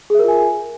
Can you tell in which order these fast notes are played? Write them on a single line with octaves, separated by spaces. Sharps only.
G#4 E5 A#4 F4 G#5